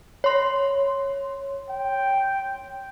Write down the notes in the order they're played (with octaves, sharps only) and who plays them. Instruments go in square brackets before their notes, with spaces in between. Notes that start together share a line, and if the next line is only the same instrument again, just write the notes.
[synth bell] C#5 C6
[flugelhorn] G5